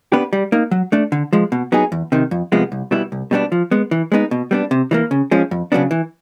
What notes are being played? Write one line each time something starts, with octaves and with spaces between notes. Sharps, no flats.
B3 D4 G4 B4
G3
A#3 D#4
F#3
A3 D4
D3
F3 G#3
B2
F#3 B3 D#4 G#4
E2
C3 D#3
F2
C3 F3 G#3 B3
C2
B2 G3 B3 E4
C2
B2 G3 B3 D4
F3
G#3 B3
E3
G#3 B3 D#4
B2
G3 B3 D4
C3
E3 G3 A#3
C#3
F3 G#3 C#4
F2
C#3 F#3 B3 D4
E3